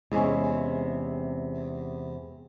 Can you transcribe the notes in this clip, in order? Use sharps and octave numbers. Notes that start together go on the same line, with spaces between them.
E2 C3 G#3 C#4